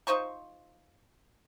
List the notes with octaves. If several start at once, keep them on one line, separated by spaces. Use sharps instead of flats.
D#4 F4 C5 C#6